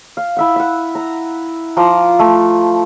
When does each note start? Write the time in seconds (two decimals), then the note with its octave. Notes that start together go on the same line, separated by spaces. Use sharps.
0.17 F5
0.37 E4 E5 F#5
0.56 E5 F#5
0.95 A#5
1.77 F3 A#5 C6 D6
2.19 A3